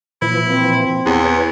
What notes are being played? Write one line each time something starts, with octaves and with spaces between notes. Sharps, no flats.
A#2 E3 F3 E4
C4
E2 B4 C#5